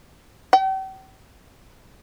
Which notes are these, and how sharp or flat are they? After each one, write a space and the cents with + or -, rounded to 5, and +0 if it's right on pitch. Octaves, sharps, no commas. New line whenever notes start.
G5 -40